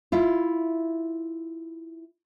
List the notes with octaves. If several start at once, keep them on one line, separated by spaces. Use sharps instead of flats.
E4 F4